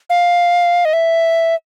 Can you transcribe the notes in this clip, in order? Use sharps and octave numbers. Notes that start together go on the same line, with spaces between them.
F5
D#5
E5